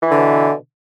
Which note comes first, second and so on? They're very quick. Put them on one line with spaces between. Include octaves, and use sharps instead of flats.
E3 E4 D3 B2